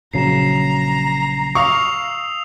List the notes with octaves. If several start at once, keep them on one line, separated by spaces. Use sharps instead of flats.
A#1 C#3 F#3 A#5 C7 E7
F5 C#6 D#6 E6 F7